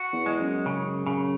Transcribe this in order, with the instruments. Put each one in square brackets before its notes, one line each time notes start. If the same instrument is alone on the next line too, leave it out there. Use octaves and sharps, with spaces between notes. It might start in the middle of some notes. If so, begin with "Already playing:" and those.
Already playing: [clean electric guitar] F#4
[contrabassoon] E2
[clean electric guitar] G#3
[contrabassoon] F#2
[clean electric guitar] C#3
C#3